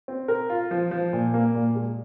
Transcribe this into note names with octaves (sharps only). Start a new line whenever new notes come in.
C4
A#4
F4
F3
F3
A#2
A#3
A#2
G#3